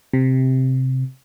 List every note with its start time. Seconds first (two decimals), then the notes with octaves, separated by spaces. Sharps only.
0.13 C3